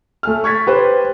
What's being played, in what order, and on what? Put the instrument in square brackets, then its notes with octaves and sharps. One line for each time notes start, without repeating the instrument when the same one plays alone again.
[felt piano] A3 G#5 F6
C#6 G#6 A6 B6
G4 B4 C5